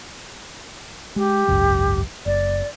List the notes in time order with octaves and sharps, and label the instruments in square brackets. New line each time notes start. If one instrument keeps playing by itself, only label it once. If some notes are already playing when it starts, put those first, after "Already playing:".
[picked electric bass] G#3 [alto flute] G4
[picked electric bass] G#1 C#2 F#2
[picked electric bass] F#1 [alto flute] D5